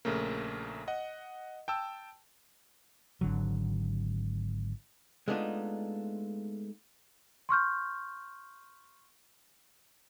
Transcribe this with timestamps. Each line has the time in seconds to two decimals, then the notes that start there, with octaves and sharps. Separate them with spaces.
0.05 A#1 C#3 A3 A#3
0.88 D#5 F#5
1.68 G5 A5 E6
3.21 G#1 D3 F#3
5.28 G#3 A3 B3 D4 D#4 F4
7.49 C6 C#6 F6 G6